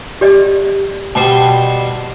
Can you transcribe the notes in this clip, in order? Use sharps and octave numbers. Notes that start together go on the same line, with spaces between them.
G4 D5 D#5
B2 G3 C5 A5